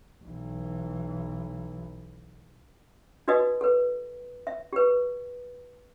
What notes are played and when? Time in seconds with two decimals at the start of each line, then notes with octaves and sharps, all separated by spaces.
0.24 B1 E3
3.28 D#4 F#4 B4 D#5 D#6
3.61 A4 B4
4.47 E5
4.73 G4 B4